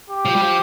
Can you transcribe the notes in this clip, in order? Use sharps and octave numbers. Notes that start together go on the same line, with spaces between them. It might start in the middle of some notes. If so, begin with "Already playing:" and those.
G4
F3
G3
F3